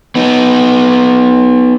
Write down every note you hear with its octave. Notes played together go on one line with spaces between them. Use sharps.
B3 D#4